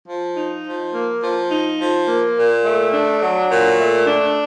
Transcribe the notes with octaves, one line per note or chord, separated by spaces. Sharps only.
F3
D#4
F3
A#3
F3
D#4
F3
A#3
A#2
A3
D4
F#3
A#2
A3
D4